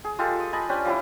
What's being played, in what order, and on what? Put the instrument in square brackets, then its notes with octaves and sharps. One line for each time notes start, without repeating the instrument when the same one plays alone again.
[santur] G#4
G#3 F4 G4 A4
D#6
D#5 G#5 A5 B5
C#4 D4 G4 C5
F3 G3 C#4 E4